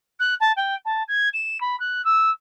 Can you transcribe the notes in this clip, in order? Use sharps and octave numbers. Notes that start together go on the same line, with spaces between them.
F#6
A5
G5
A5
G#6
E7
B5
F#6
E6